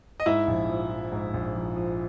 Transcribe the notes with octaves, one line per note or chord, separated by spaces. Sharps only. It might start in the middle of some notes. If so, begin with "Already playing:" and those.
D#5
G#2 E4 E5
A#1
F3
F3
G#2
A#1
F3
F3